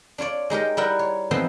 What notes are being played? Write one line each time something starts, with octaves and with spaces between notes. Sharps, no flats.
D4 F4 C#5 D5
G#3 D#4 G4 A#4
G3 D#4 E4 A#4 F#5 G5
C#5
E3 F3 B3 C4 D#4 C6